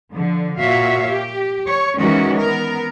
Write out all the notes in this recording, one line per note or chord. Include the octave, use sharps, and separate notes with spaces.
D3 F3
A#2 F#4 C#5 E5 F5
G4
C#5
D#3 E3 G#3 C#4 F#4
B3 A#4